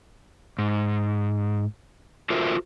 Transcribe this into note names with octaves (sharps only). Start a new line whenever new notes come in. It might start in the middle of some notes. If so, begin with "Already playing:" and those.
G#2
F4 F#4 A4 A#4 C5 E5